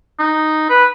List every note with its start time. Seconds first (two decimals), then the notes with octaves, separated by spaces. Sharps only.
0.19 D#4
0.70 B4